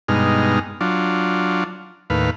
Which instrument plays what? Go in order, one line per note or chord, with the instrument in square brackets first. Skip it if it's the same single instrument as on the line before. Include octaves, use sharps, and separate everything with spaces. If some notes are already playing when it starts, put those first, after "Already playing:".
[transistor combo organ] G2 B2 G#3 D#4 F6
F#3 D4 F4
D#2 A2 B4 F5